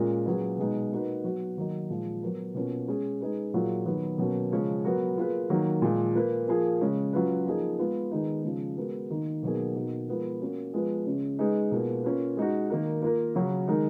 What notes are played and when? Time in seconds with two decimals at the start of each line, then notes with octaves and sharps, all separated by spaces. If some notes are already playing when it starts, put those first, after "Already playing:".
Already playing: A#2 G#3 C#4 F4 A#4
0.26 A#2 F#3 C#4 G#4 B4
0.58 B2 G#3 D#4
0.92 A#3 D#4 F#4 B4
1.24 F#3 B3 F#4
1.58 D#3 F#3 A#3 D#4
1.90 A#2 F3 G#3
2.23 F#3 B3 F#4 A#4
2.55 B2 A#3 C#4 F4
2.88 G#3 C#4 G#4
3.20 G#3 D#4 G#4 B4
3.54 A#2 F#3 A#3 F4 G#4
3.86 D#3 F#3 B3
4.18 B2 F#3 A#3 C#4
4.51 C#3 F3 G#3 C#4
4.84 F#3 B3 F#4 A#4
5.17 A#3 F4 G#4 B4
5.50 D#3 F#3 A#3
5.82 A#2 F3 G#3
6.15 A#3 F4 B4
6.48 F3 A#3 F4 G#4
6.81 C#3 G#3 C#4
7.13 F#3 C#4 F4 B4
7.46 F3 A#3 D#4 G#4
7.79 G#3 B3 F4
8.11 D#3 G#3 B3 D#4
8.44 C#3 F3 G#3
8.77 G#3 B3 F#4 A#4
9.10 D#3 A#3 D#4
9.43 B2 F#3 A#3 D#4 G#4
9.75 B2 A#3 D#4 F#4
10.08 F3 G#3 B3 F4 A#4
10.40 A#3 C#4 F#4
10.73 F3 G#3 B3 F4 B4
11.07 C#3 G#3 C#4
11.39 G#3 D#4 G#4 B4
11.71 B2 A#3 F4 G#4 B4
12.04 A#3 C#4 F4 B4
12.37 G#3 D#4 F#4
12.70 D#3 A#3 D#4 A#4
13.02 A#3 F4 A#4
13.35 C#3 F#3 C#4 F#4
13.68 D#3 G#3 D#4 A#4